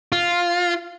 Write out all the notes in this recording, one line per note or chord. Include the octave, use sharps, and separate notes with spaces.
F4